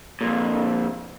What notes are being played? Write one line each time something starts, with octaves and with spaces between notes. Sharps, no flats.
F2 A#2